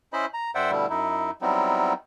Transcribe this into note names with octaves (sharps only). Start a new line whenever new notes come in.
C#4 E4 C5 D#5 B5
A#5
F#2 C5 D5 E5 F#5 G5
B2 D3 G3 A3 E4
F#2 D#4 E4
F#3 G3 B3 C4 D#4 E4